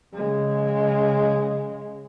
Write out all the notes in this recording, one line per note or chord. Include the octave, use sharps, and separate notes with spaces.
C#3 G#3